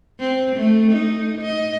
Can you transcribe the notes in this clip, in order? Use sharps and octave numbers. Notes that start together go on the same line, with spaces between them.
C4
A3
D#4
D#5